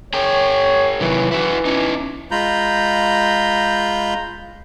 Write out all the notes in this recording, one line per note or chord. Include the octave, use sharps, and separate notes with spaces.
G#4 A#4 C#5 G5
C3 D#3 E3 F#3
E3 E4 F#4
C#4 D#4
G#3 F4 A#5 B5 G6